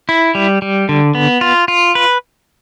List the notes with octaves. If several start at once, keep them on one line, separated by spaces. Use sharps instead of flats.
E4
G3
G3
D3
B3
F4
F4
B4